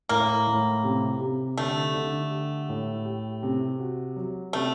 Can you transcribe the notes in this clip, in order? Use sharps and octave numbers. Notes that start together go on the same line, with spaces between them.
A2 A#3
A2
C3
C3
D3 A3
D3
G4
A2
G4
C3
F#4
F#3
C3 A3